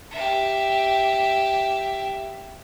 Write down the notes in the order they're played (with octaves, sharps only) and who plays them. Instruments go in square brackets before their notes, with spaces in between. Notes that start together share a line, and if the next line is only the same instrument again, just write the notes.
[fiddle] G4 E5